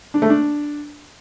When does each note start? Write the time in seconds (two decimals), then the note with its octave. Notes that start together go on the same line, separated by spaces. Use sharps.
0.14 D4
0.22 A3
0.30 D4